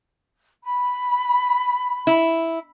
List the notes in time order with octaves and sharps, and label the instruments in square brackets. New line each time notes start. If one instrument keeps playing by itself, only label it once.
[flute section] B5
[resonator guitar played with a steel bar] E4